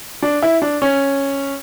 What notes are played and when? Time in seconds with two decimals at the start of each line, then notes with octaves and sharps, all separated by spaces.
0.23 D4
0.42 E4
0.62 D4
0.82 C#4